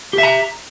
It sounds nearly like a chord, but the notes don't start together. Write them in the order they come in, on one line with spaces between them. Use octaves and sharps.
G4 E5 A#5